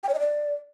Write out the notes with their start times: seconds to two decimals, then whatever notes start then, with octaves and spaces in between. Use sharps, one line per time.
0.03 G5
0.09 C#5
0.14 D#5
0.19 D5